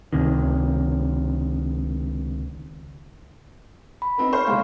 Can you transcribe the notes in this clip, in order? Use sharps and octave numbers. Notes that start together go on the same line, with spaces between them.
C#2 C3 D#3
B5
B3 C4 D#4
C5 C#6 F6
F#1 G#3 F5 F#5 C6